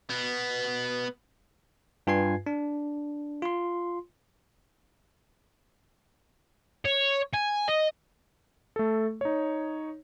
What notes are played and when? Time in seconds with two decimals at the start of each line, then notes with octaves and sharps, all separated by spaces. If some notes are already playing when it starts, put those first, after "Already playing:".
0.10 B2 B3
2.07 G2 F4 B4 G#5 G#6 C7
2.46 D4
3.42 F4 C6
6.85 C#5
7.34 G#5
7.69 D#5
8.76 A3 A4
9.21 D#4 C#5